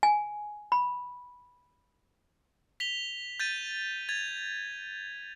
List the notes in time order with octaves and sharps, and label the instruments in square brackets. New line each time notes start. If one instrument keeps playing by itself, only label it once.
[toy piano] G#5
B5
[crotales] B6 F7 G7
G6 A6 D#7
G#6 A6 F7